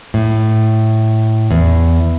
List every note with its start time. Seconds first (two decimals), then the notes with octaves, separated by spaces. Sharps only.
0.14 A2
1.51 E2